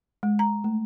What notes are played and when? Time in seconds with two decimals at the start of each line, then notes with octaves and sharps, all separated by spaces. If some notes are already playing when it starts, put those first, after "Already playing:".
0.23 G#3
0.39 A#5
0.64 A3